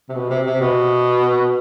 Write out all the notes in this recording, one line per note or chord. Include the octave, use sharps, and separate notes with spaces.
C3
B2
C3
C3
B2